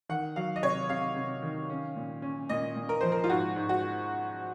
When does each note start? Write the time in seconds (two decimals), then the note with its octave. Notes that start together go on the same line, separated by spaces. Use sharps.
0.09 D#3 F#5
0.36 F#3 F5
0.56 D#5
0.62 C3 C#5
0.89 C3 F5
1.16 C3
1.42 D#3
1.70 C#4
1.96 A#2
2.22 C#4
2.49 A#2 D#5
2.76 A#2
2.89 A#4
3.01 F3 C5
3.12 A#4
3.24 F4
3.29 G#2 F#4
3.56 G#2
3.69 F#4